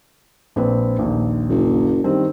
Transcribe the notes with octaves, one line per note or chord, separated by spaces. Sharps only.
A#1 C4 B4
A#1 D#2
F#1
G2 D#3 C4